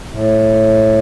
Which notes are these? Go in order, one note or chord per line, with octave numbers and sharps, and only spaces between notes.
A2